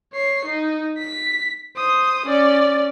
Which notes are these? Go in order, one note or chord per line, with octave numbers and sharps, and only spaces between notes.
C#5 C7
D#4
B6
C5 D#6
C#4 D5